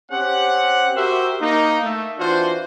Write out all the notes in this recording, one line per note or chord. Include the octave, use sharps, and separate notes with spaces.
C4 C#4 G4 F#5
F#4 G4 A#4 C5 E5
A#3 D#4
A3
E3 D4 F4 F#4 C5